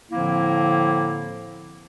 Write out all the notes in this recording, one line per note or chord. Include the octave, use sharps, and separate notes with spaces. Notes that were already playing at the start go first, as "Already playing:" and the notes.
A2 D3 F3 A#3 C4 E4